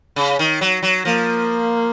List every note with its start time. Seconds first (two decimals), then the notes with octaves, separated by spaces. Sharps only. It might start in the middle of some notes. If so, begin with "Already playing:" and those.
0.16 C#3
0.39 D#3
0.61 F#3
0.82 F#3
1.05 F3 A#3